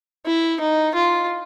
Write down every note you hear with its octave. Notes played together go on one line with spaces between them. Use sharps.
E4
D#4
F4